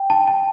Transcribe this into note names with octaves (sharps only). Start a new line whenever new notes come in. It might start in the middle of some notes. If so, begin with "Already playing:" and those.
Already playing: G5
A5
A5